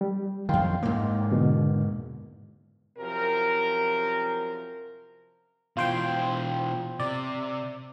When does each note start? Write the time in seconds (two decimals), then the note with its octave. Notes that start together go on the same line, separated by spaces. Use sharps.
0.01 G3
0.49 F2 D#3 F5 G5 C6
0.83 G#2 A#3
1.31 E2 B2 D3
2.97 F#2 C3 F3 A#4
5.77 B2 E3 F4 C5 G5
7.00 C3 D5